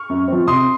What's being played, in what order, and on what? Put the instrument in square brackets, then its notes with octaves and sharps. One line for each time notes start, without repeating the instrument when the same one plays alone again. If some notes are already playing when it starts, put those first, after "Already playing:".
Already playing: [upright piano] C#6 F6
[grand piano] F#2
F3 C4
[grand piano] C3 [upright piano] C6 D#6